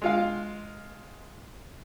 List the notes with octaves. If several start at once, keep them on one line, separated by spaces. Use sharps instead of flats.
G#3 F4 F5